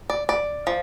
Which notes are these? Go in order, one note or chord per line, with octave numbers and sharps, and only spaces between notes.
D5
D5
F3